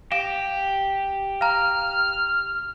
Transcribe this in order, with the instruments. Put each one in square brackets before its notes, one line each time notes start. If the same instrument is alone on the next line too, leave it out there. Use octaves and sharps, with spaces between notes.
[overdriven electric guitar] G4 [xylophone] F5 D7 E7
[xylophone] F5 A#5 [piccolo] F6